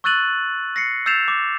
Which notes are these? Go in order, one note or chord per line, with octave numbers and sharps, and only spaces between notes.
C#6 E6 F#6 A6 D#7 F#7
A#6 C7 C#7
E6 G6 A6 C7 E7 F7
D6